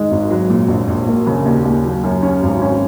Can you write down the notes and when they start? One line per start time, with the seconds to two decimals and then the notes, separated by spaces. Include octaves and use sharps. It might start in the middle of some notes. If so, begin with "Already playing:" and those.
Already playing: G#2 D#3 G#3
0.11 G#1
0.30 F#3
0.50 A#2
0.68 A#1
0.88 A#1
1.07 A#3
1.27 C#3
1.45 D#2
1.65 D#2
1.84 F#3
2.04 F#2
2.22 C#4
2.42 G#1
2.62 C#4